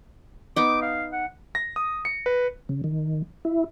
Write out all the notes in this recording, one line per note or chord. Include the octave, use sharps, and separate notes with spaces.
B3 D#4 D6
F5
F#5
A#6
D#6
C#7
B4
C#3
D#3
E4